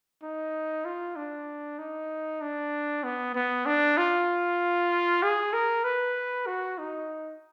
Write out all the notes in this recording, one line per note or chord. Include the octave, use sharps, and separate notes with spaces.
D#4
F4
D4
D#4
D4
B3
B3
D4
F4
G#4
A#4
B4
F#4
D#4